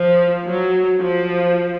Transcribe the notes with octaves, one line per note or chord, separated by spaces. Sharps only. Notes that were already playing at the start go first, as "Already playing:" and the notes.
Already playing: F3
F#3
F3